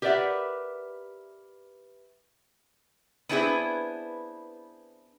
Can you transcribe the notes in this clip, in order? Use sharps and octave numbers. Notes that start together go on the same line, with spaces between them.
G4 A#4 B4 D5 E5 F#5
B3 C4 D4 E4 G#4 B4